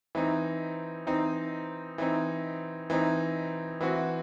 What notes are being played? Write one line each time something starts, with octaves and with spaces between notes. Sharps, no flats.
E3 C4 D#4
E3 C4 D#4
E3 C4 D#4
E3 C4 D#4
E3 C4 F#4